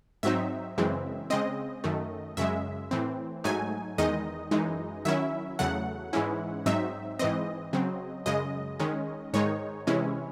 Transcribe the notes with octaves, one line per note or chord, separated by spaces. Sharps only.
G#2 F#3 C4 D#4 E5
F#2 C#3 E3 G#3 C4
C#3 G#3 C4 D#5
F#2 D#3 A3
F#2 C#3 G#3 E5
A2 E3 C4
G#2 F#3 A3 D#4 G#5
E2 D#3 G#3 D#4 D#5
F#2 E3 G#3 D#4
D#3 F#3 C#4 E4 E5
E2 C#3 F#3 A3 F#5
G#2 E3 G#3 C#4 E4
G#2 F#3 C4 D#4 E5
G#2 E3 C4 D#5
C#3 F#3 C4
F#2 C#3 G#3 D#5
D#3 G#3 C#4
G#2 D#3 G#3 D#4 C#5
C3 E3 G#3 C#4 E4